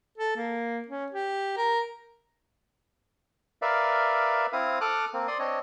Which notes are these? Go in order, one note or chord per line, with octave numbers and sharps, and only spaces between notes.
A4
A#3
C#4
G4
A#4
A#4 B4 D5 E5 F5
C4 E4 F5 D#6
A4 D6 D#6 F6 F#6
A#3 C4
D5 C6 D#6
C4 D4 C#5 D#5